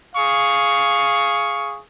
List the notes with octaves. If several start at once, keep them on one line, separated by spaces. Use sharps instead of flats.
G#4 F5 C#6